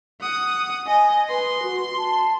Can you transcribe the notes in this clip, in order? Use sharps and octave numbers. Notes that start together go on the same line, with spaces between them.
F#5 D#6
D#5 G#5
B4 C6
F#4
A5